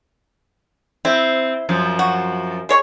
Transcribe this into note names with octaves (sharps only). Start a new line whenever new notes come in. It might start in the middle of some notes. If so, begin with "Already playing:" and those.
C4 E4
F#2 F3
F#4
G#3 C#5 C#6